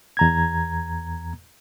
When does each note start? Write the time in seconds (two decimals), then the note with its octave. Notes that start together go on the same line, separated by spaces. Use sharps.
0.17 E2 A#5 G#6